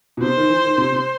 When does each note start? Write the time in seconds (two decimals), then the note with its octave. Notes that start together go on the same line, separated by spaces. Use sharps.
0.17 B2
0.22 C3 C5
0.37 D#3
0.50 E3
0.64 D#3
0.78 C3
0.92 C3